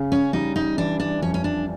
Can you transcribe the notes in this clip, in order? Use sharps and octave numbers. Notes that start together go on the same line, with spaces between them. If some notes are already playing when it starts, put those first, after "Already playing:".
Already playing: C#3
C#4
G3 D#4
D#4
E3 D4
D4
F2 C#4
C#4
D4